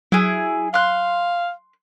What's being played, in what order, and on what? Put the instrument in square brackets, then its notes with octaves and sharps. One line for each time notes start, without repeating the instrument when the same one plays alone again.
[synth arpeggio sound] F#3 [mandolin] E4 G#4
[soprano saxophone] F5 [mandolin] C6 F#6